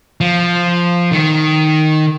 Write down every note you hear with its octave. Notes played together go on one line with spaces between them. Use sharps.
F3
D#3